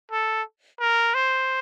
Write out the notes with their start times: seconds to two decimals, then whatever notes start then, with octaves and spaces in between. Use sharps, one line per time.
0.12 A4
0.80 A#4
1.14 C5